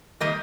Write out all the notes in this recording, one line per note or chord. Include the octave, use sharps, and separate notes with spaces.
D#3 G3 A#3 D#5